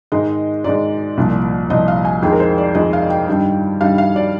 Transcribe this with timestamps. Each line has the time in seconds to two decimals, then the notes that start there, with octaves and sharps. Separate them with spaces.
0.12 G#2 D#3 G#3 D#5
0.64 G#2 D#3 G#3 D5
1.17 C2 A#2 F3
1.70 C2 A#2 F3 D#5
1.88 F5
2.05 G#5
2.22 F2 D#3 G#3 G5
2.32 A#4
2.40 C5
2.58 D5
2.75 F2 D#3 G#3 D#5
2.93 F5
3.10 G5
3.28 G2 D#3 G3
3.81 G2 D#3 G3 F5
3.98 F5
4.16 D5